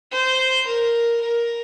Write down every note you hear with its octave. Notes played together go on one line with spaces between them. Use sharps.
C5
A#4
A#4